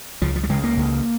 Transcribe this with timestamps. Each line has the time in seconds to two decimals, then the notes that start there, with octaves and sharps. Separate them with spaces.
0.22 C#2 C#3 F3
0.36 F3
0.43 G3
0.49 C#2 C#3 G#3
0.64 A#3
0.77 C#2 C#3